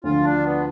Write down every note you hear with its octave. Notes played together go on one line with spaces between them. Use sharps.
D2 D3 F3 F4
D4
B3